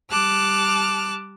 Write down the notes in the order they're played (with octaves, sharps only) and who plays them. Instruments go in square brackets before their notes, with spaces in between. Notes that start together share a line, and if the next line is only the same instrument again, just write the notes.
[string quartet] G3 A5 D6 F6 F#6